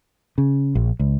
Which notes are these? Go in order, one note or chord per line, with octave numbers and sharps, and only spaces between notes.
C#3
A#1
C#2